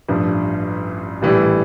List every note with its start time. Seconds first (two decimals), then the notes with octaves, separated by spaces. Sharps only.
0.08 A1 G2 F3
1.21 A#1 A2 E3 G3